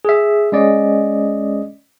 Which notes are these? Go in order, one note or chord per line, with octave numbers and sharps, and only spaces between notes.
G#4 E5
G#3 C#4 D5 D#5